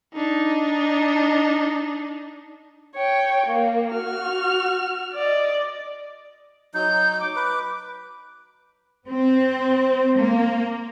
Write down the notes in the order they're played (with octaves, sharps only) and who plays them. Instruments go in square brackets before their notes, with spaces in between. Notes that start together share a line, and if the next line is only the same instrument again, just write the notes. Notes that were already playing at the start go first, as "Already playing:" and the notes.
[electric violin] D4 D#4
[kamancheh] C#5 G5
A#3
F#4 F6
D5 D#5
[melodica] F#3 D#4 [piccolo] G6
[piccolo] D6
[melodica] B4
[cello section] C4
A#3